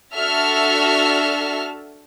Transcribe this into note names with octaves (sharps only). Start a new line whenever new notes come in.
D4 F#4 A4 E5 A5 F6